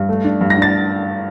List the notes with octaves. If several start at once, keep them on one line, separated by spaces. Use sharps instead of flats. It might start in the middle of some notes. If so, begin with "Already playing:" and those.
Already playing: G2
A3
D4
G2
A#6
D4
A6